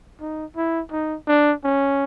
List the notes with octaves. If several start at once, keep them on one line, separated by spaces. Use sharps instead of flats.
D#4
E4
D#4
D4
C#4